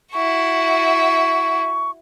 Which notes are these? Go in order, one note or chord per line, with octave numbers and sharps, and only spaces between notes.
E4 F#4 C#6